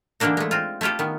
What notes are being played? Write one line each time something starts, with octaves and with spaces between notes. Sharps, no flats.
D3 E3 A3 A#3 D4 D#4
G#3 A3
C4 F4
A3 E4 F4 G4 A4
D#3 B3